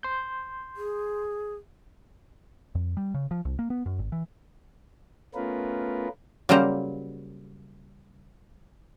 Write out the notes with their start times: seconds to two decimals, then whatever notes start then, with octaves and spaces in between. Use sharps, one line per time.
0.03 C6 G6
0.77 G#4
2.75 F2
2.97 G3
3.14 C#3
3.31 F3
3.45 C2
3.59 A#3
3.70 B3
3.86 F#2
3.99 G#1
4.12 E3
5.35 A3 B3 C#4 F4 A#4 B4
6.49 C#3 F#3 G3 A#3 C5 A#5